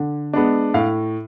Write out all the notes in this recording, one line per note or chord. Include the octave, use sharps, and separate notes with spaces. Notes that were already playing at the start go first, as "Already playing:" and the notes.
Already playing: D3
G#3 B3 D4
A2 F5